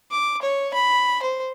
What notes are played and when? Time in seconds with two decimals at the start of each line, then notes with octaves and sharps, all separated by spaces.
0.11 D6
0.42 C#5
0.73 B5
1.22 C5